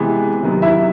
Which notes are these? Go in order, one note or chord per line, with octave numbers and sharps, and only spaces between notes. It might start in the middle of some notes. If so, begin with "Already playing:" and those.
Already playing: C3 E3 G#3 B3
C3 D#3 F#3 B3
E4 E5